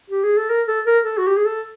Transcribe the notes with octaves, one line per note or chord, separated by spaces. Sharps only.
G4
G#4
A4
A#4
A4
A#4
A4
F#4
G4
G#4
A4